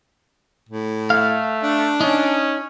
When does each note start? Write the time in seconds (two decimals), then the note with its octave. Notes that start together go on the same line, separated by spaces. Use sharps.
0.69 A2
1.10 A3 F5
1.63 D4
2.01 C#4 D#4